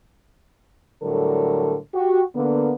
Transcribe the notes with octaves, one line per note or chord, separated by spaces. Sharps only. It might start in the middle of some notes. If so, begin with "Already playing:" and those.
A2 D3 F#3 G3 A4 A#4
F#4 G4
D3 A#3 B3